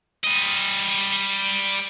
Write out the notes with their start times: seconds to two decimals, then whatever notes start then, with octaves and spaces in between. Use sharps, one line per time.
0.24 G3 D#5